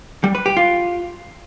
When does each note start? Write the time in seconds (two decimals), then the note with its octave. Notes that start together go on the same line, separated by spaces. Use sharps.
0.24 G3
0.35 B4
0.46 G4
0.57 F4